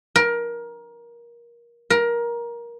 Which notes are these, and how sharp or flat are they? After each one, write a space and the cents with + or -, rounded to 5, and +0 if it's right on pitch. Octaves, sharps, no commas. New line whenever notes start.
A#4 +20
A#4 +20